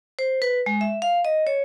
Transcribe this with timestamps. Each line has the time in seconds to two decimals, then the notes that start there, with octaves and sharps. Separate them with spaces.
0.19 C5
0.42 B4
0.66 G#3
0.81 E5
1.02 F5
1.25 D#5
1.47 C#5